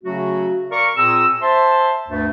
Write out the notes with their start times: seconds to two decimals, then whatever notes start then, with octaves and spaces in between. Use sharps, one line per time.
0.04 C#3 F#3 A3 C#4 F#4
0.71 A#4 D5 F5 A#5 C#6
0.97 A#2 C4 G#4 A#5 D#6 E6
1.42 C5 E5 A5 C6
2.08 D2 G2 A3